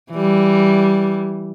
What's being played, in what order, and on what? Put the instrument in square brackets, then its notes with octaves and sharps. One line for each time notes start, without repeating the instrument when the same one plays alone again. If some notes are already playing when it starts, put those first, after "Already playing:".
[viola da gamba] E3 G3